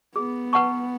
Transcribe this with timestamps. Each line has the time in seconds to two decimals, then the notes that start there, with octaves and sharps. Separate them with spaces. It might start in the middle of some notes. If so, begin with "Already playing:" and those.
0.16 B3 G#4
0.53 B4 F#5 A5 C#6